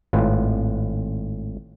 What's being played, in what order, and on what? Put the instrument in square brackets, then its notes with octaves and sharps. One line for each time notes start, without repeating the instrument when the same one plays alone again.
[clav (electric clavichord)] G#1 A2 F4 B4